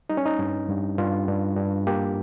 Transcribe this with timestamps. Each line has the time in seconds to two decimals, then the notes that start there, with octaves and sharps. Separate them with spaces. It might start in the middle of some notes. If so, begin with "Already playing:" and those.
0.10 G3 D#4
0.17 C#4
0.26 D#4
0.39 G2
0.68 G2
0.98 G2 F4
1.28 G2
1.57 G2
1.87 A#3 G4